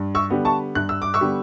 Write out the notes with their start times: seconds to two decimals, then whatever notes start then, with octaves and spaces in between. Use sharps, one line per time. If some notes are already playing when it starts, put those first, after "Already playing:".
Already playing: G2
0.15 C#6 E6
0.30 D3 G3 B3
0.45 A5 C#6
0.75 G2 F#6
0.89 E6
1.02 D6
1.14 C#6 E6
1.21 D3 G3 B3